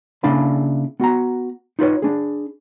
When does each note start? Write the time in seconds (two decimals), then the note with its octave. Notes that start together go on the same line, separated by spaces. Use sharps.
0.24 C#3 A#3 D4 E4 F5 B5
1.00 B3 F#4 F#5 A#5
1.79 D#4 F4 B4 C#5
2.02 D4 G#4